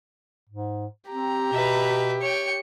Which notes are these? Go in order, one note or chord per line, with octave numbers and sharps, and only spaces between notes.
G#2
C4 G4 A#5
B2 B4 E5
C#5 G5 C#7